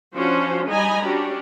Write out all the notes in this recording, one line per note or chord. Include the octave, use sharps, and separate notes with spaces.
F3 C#4 D4 F#4 C5
G3 D#4 D#5 G#5 A#5 B5
C#4 D4 F#4 G4